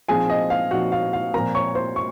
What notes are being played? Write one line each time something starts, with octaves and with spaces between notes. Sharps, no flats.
A#2 F3 C4 D#4 G#4 G#5
D#5
F5
A#2 F3 C4 D#4 F#4 F#5
F5
F5
A#2 F3 C4 A#4 A#5
C#5 C#6
C5 C6
C#6